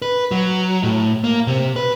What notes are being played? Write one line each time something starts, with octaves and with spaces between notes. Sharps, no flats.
B4
F#3
A2
A#3
C3
B4